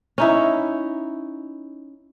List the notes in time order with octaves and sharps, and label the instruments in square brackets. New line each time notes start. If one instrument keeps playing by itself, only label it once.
[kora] C#4 D#4 E4